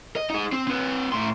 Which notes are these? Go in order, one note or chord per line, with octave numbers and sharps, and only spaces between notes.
D#5
D#4 G#4
C4
C4 B4
A2 C6